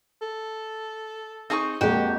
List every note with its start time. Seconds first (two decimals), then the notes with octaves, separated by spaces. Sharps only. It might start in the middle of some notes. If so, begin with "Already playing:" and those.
0.22 A4
1.50 C4 D#4 G#4 A5 C#6
1.81 F2 G#3 A#3 F#4 G4 G5